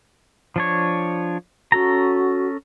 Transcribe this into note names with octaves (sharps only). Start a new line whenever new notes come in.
F3 D4 C#5
C#4 F#4 A4 A#5